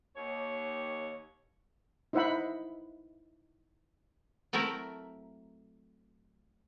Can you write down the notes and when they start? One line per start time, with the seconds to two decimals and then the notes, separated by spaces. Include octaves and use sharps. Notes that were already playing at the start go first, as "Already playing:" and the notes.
0.16 D#2 C#5
2.13 D#4 E4 C5 E5 F#5 B5
4.53 F#3 A3 C4 E4 A#4